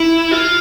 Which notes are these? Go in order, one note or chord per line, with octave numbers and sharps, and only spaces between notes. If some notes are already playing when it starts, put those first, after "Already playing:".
Already playing: E4
F4